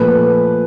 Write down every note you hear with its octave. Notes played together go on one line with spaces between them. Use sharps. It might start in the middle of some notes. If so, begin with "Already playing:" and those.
Already playing: A#2 F3 A3 B4